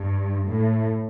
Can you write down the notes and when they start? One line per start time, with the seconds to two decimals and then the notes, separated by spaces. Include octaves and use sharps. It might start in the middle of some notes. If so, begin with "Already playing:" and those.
Already playing: G2
0.48 A2